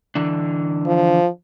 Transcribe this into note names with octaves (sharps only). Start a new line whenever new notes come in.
D3 E3 D4
F3